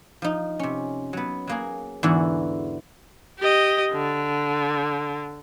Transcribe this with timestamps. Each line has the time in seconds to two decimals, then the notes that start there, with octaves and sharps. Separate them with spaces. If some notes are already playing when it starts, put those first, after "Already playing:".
0.22 F3 D#4
0.59 C3 C#4
1.13 F#3 B3
1.47 F#3 A#3 G#4
2.03 E2 G#2 D3 E3 B3 F#4
3.39 G4 D#5
3.92 D3